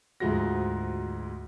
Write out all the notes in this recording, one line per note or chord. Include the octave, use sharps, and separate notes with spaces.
D2 G#2 G#3 F4 F#4 A#6